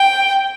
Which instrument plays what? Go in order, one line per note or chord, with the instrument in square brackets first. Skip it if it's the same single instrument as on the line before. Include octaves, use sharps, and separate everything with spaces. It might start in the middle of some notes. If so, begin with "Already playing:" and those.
Already playing: [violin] G5